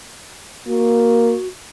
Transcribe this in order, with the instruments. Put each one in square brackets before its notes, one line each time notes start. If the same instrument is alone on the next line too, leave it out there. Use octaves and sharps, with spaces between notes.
[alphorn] A#3 [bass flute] F#4